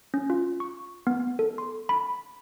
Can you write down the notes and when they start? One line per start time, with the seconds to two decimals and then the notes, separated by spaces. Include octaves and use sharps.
0.14 C#4
0.30 F4
0.60 C#6
1.07 B3
1.39 A4
1.58 C6
1.89 B5